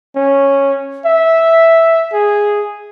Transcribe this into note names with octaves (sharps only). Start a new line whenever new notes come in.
C#4
E5
G#4